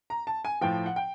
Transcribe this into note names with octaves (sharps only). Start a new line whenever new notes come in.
A#5
A5
G#5
A2 F3 G5
F#5
G5